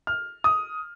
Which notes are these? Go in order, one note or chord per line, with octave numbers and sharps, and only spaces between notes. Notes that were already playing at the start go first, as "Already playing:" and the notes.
F6
D#6